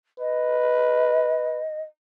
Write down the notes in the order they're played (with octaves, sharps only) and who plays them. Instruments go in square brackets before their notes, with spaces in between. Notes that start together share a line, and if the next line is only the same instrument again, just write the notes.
[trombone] B4 [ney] D#5